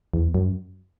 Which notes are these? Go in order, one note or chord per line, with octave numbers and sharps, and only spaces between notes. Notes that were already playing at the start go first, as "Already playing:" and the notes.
E2
F#2